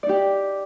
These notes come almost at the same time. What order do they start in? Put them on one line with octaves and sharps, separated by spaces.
D5 D#4 G4